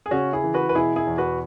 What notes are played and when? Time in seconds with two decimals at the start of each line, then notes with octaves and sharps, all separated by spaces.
0.06 G#4
0.11 C#3 C#4 F#4
0.33 E4 G#4
0.44 E3
0.54 F#4 B4
0.69 B4
0.75 B2 E4 G#4
0.96 E4 G#4
1.07 E2
1.18 F#4 B4